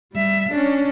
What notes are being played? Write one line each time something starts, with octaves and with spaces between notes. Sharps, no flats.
G3 E5
C#4 D4